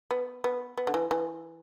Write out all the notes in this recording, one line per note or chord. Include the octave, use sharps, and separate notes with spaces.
B3
B3
B3
D3
E3
E3